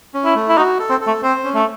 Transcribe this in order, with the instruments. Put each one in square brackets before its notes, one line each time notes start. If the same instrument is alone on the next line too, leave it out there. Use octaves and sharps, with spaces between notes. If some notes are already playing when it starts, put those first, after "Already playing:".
[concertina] C#4
[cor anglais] E4
[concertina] A3
[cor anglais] E4
[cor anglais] D#4 [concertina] F#4
[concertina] A4
[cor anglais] C4
[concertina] A4
[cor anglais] A3
[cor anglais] C4 [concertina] C5
[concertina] C#4
[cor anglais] A3